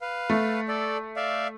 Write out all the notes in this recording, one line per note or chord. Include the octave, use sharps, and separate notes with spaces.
B4 F5
A3
A4 D5
D5 E5 F5